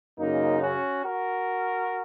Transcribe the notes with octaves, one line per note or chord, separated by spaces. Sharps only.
F#2 C#3 A#3 D#4
C#4 F#4
F#4 A#4